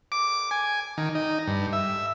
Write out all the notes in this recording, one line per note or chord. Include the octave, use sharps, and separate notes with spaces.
D6
G#5
D#3
D#4
G2
E5